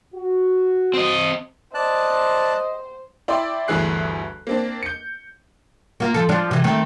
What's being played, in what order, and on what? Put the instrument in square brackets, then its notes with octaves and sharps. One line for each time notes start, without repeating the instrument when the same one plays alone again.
[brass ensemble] F#4
[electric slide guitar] C4 D#5
[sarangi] C5 [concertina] D5 A5 F#6 [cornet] D#5
[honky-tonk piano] E4 D5 G5 B5 C6 D6
G1 D2 E3 G#4 F#6 C7
A#3 C4 D4
G6 C#7
[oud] A#3 F4
F3 A4
F3 D4
C3 E3
D#3 A3 C4